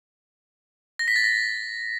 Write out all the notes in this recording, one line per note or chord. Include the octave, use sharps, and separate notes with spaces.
A#6
B6
A6
A#6